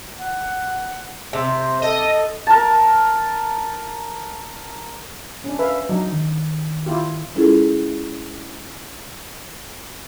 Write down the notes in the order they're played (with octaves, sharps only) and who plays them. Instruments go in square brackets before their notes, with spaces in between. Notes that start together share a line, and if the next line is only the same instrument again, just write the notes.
[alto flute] F#5
[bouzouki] C3 [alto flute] C5
[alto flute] A4 [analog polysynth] D#5
[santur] A#4 A5
[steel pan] C#4 D4
[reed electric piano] B4 [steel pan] E5 F5
[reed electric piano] F#3 [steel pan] D4 D#4
[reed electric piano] D#3
[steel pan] E4 F4 G4
[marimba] G#3 C#4 E4 F4 G#4 A4